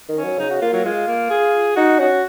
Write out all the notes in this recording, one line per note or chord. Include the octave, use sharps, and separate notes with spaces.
D#3
C#4
F#3
C#3 D#4
F#4
A#3 F4
F#3
G#3 F4
A#3
G#4
D#4 F#4
C#4 F#4